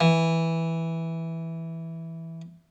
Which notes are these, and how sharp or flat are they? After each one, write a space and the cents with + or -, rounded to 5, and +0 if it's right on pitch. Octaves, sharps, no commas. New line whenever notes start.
E3 -5